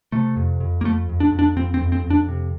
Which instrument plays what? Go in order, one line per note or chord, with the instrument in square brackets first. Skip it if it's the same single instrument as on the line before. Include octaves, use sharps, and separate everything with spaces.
[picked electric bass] C3 A3
F2
F2
A#3
F2 A3
F2
D4
F2
D4
F2 C4
C4
F2
C4
F2
D4
C3